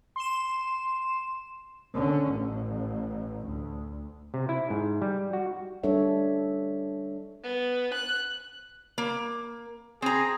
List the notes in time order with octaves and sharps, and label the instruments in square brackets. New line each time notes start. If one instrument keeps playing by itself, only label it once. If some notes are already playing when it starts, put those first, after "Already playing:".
[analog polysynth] C6 E7
[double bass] D3 C#4
A1 A2
D2
[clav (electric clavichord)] C3
E4
G#2
G3
F#4
[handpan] G3 D4 A4 C#5 E5
[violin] B3
F#6
[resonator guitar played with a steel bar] A#3
[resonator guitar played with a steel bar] C4 A#5 [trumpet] G#4